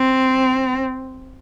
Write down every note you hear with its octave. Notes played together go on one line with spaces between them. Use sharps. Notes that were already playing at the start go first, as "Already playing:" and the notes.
Already playing: C4